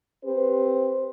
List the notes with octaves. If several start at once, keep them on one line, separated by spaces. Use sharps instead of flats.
C4 G4 B4 C5